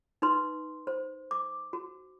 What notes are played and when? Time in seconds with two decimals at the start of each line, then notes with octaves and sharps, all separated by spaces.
0.22 D#4 B4 C6
0.87 C5
1.31 D6
1.73 F#4